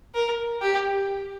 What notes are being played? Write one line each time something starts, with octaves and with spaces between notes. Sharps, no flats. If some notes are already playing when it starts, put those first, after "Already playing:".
A#4
G4